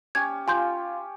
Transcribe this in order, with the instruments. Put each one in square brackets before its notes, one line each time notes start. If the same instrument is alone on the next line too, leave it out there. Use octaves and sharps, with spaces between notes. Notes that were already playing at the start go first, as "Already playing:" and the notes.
[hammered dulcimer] C#4 G4 [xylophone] G#6
[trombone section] F4 [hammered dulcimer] G4 [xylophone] G#5 C6 G6